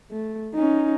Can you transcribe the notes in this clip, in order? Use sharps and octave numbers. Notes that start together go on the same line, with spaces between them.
A3
C#4 D#4